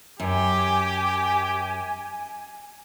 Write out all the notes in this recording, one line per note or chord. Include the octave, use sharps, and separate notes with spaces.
F#2 G4 G#5